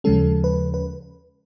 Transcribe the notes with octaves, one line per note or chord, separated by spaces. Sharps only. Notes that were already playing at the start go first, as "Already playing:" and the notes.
D#2 C#3 F3 G#3 C#4 A4
B4
B4